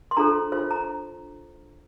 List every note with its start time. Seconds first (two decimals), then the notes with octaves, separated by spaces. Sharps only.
0.11 C6
0.17 D4 F4 A4 C5 A#5
0.52 F4 C5
0.71 A#5